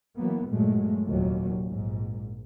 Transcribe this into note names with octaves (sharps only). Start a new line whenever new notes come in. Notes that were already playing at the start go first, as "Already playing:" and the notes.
E3 F#3 A#3 B3
G2 A#2 F#3 G#3 A3
F1 D#2 A#2 F#3
A#1 G#2